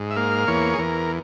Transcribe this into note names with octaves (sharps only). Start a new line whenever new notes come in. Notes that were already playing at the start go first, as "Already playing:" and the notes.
Already playing: G#2
E5
A#3 F5
E2 C#5
G#4
E2 A#4